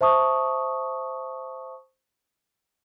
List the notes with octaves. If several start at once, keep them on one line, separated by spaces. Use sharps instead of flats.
C5 E5 A5 C#6 D#6